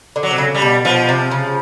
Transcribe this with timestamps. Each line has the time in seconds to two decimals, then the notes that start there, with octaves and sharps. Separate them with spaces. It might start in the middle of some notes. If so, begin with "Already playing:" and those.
0.16 D3
0.23 F#3
0.31 C3
0.38 C#3
0.54 G3
0.62 B2
0.85 B2 F3
1.09 C3
1.31 C#3